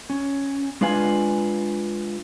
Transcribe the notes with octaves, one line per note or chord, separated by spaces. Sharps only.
C#4
G#3 D4 F4 B4 F5 G#5